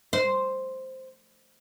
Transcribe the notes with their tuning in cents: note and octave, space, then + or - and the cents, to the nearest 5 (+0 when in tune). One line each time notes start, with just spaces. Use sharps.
C5 +0